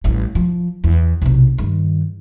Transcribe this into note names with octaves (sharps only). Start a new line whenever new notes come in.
A1 G3
F3
E2
B1 C3
G2 D#3